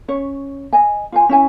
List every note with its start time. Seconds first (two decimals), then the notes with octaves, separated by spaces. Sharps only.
0.08 C#4 C#5
0.73 D#5 G#5
1.12 F4 C5 G#5
1.29 C#4 E4 G#5